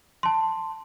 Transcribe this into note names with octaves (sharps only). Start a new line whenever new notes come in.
A5 C6